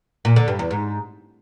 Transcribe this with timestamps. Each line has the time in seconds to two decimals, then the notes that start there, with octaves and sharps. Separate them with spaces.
0.25 A#2
0.36 D3
0.48 G2
0.59 E2
0.71 G#2